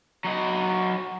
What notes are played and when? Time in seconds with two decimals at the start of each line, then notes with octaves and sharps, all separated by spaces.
0.24 F#3 D#5